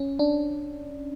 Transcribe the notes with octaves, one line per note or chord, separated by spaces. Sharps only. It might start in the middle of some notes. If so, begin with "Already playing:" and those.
Already playing: C#4
D4